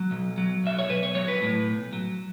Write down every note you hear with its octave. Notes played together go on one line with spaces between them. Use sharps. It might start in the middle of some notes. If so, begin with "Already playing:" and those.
Already playing: F#3
B1
F#3
B1 E5
C#5
B1 B4
C#5
F#3 C#5
B4
A2
B1
F#3